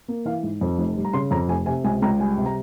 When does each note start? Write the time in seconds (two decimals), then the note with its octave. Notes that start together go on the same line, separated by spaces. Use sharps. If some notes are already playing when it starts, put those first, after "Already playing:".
0.08 A#3
0.25 E3 F5
0.43 G#2
0.61 F2
0.78 F1
0.97 G3
1.05 A#5
1.13 C#3 C6
1.31 F2 A#5
1.48 F1 G#5
1.66 C3 G#5
1.84 C#2 G#5
2.02 C#2 A#5
2.19 G3 G#5
2.37 C3
2.46 A#5